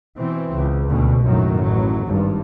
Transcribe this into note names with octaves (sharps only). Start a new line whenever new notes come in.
B2 E3 C4
C#2
D2 B2
A#1 F#2 A2 D#3 F#3
A1 F#3
G#1 G2